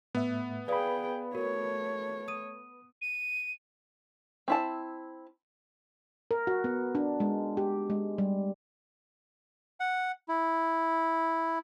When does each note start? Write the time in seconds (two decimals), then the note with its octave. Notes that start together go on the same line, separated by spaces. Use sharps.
0.15 A2 A3 B3 E5
0.68 G#4 B4 D5 F5 G5 B5 D#6
1.35 A3 F#4 A#4 C#5
2.28 D#6 D#7
3.01 D#7
4.48 C4 E4 A5
6.31 A#4
6.47 F#4
6.64 B3
6.95 D4
7.20 G#3
7.57 G4
7.90 G#3
8.18 G3
9.80 F#5
10.28 E4